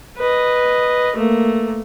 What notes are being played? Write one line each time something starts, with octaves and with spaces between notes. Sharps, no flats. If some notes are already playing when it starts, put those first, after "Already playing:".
B4 D#5
A3 A#3